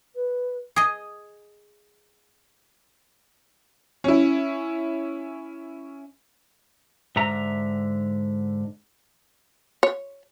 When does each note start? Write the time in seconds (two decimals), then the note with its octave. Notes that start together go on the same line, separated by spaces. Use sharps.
0.15 B4
0.76 G#4 D#5
4.04 C#4 E4
7.16 G#2 D3 E5 A#5
9.83 C#5